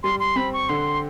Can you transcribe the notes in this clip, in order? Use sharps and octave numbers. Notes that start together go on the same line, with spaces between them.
G3 C6
C6
C4 B5
C#6
D3 C6